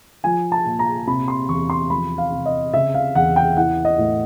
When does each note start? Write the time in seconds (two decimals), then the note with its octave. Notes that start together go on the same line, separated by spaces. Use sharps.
0.24 F3 G#5
0.52 A5
0.65 A#2
0.79 A#5
1.07 C3 B5
1.28 C6
1.49 E2 C#6
1.70 C6
1.90 F3 B5
2.18 F5
2.32 C3
2.46 D#5
2.74 C#3 E5
2.94 F5
3.15 E2 F#5
3.36 G5
3.57 E3 F#5
3.85 D#5
3.98 A2